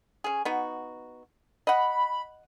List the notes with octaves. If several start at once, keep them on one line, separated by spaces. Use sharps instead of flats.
C#4 G#4
B3 D#4 F#4
D#5 F#5 B5